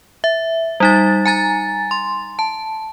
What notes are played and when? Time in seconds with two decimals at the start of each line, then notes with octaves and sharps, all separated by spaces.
0.24 E5
0.80 G3 D#4 A6
1.26 G#5 A#5 A6
1.91 C6
2.39 A5